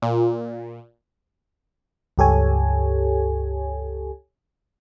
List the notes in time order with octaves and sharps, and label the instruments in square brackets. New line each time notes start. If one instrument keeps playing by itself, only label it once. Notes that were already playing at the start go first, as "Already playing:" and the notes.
[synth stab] A#2
[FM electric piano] C#2 G2 G4 A4 C#5 G#5